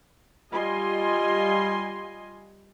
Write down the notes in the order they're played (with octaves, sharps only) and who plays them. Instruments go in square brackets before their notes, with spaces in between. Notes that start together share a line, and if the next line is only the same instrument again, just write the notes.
[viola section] G3 F4 D#5 G#5 C6